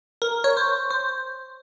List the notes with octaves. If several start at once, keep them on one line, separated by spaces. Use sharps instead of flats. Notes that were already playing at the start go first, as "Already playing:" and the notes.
A#4
C#5
C5
C5